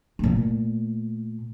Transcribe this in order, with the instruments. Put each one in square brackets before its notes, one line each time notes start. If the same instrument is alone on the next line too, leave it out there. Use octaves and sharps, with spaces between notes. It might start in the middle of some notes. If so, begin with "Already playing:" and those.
[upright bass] A#2 A3